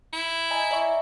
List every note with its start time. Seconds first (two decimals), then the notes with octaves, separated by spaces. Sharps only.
0.13 E4
0.51 D#5 G#5 A#5
0.71 D5 E5 C#6